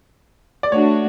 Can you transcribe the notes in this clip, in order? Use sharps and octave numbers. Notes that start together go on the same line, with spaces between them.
D5
A3 D4 F#4 C#5